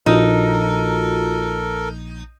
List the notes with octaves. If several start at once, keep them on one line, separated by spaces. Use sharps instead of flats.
A#1 D#4 F4 F#4 A4 A#4